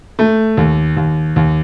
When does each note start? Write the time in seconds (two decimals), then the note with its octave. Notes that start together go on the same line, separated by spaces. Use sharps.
0.19 A3
0.57 D#2
0.97 D#2
1.36 D#2